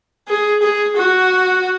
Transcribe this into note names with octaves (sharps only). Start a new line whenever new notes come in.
G#4
G#4
F#4